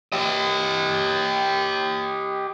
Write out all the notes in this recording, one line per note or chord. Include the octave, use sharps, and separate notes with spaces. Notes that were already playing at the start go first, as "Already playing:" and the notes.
G4 D#5